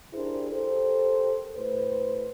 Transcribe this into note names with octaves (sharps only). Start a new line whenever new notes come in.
D4 E4 G4 G#4 A#4 C5
G4 A4 A#4 C5
A2 B4 C5